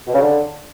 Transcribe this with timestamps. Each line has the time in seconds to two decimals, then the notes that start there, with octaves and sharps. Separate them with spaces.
0.07 B2
0.14 C#3
0.21 D3